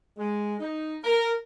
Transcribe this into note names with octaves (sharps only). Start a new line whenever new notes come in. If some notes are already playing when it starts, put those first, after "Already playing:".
G#3
D#4
A#4